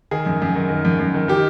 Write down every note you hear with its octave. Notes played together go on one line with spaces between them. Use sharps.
D#3 G#4
F#2
F#2
D#3
D#3
F#2
F#2
D#3
D#3 G4